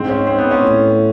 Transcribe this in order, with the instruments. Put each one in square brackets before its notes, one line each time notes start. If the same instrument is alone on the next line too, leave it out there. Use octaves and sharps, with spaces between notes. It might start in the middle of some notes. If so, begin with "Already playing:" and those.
Already playing: [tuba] G#2 [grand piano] C4
[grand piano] C#4
C4
B3
C#4
[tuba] A2